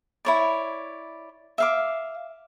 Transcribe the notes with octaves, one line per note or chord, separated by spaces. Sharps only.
E4 C#5 D5
E5 F5 D6